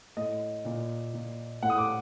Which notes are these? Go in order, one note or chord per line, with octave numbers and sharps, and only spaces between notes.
A2 D#5
A#2
A#2
A2 F#5
D#6
D6